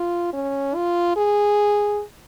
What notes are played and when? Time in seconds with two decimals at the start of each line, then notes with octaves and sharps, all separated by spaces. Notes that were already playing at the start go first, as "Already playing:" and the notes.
Already playing: F4
0.33 C#4
0.75 F4
1.16 G#4